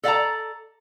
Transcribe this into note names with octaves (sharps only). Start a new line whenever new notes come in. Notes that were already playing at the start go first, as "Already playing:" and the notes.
A4 D5 F5 F#5 A5 A#5